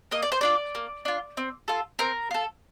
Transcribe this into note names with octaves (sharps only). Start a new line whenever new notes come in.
A#3 D#5
D5
C5
D4 F4 D5
A#3
D4 F4
C4
F4 A4
C4 A#4
F4 A4